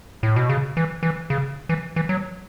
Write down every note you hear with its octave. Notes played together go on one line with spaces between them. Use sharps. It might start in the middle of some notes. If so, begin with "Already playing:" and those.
A2
B2
C#3
E3
E3
C#3
E3
E3
F#3